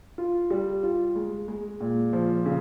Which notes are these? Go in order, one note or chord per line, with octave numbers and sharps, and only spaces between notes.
F4
G3
F4
G#3
G#3
A#2
F3
C#3